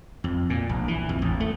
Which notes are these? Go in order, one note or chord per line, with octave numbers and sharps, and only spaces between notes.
F2
A#2
A#1
E3
F2
A1
A3